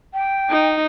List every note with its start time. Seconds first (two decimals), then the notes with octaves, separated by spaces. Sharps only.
0.13 G5
0.50 D#4